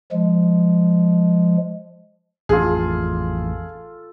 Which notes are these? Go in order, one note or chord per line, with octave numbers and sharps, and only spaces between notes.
F3 G#3
A1 F2 F4 G#4 A4